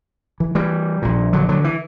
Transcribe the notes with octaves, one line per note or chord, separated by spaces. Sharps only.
E3
E3 G3
A#1 A#2
D3 F#3
D3 F#3
E3